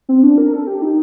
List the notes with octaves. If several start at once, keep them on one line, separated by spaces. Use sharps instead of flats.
C4
D4
A#4
A4
G4
D#4